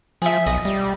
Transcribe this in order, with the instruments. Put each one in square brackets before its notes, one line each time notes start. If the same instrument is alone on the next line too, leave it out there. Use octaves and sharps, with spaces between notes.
[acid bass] F3 [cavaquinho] G#4 E5
[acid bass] B1 [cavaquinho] D#5
[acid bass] G3